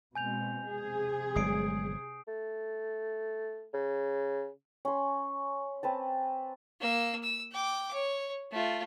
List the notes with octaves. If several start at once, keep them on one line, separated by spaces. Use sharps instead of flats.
B2 G#3 C4 G#5 G6 F7
C3 G#4
G1 F#3 G#3 D#6 C7 D7
A3
C#3
C#4 C6
C4 B4 A5
A#3 E6
E6
G5 D6
C#5
A3 F4